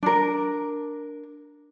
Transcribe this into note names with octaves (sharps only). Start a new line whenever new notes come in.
D4 A#4